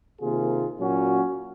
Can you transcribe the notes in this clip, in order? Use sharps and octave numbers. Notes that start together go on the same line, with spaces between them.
C3 D#3 A#3 F4 G#4
A#2 F#3 A#3 C#4 F#4